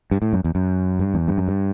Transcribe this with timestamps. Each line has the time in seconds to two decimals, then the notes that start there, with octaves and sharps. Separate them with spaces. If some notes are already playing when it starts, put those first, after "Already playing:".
0.11 G2
0.22 A2
0.33 F#2
0.44 E2
0.55 F#2
0.99 G2
1.14 E2
1.28 G2
1.38 F#2
1.48 G2